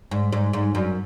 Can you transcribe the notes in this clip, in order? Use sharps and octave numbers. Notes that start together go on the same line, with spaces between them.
G#2
G#2
G#2
F#2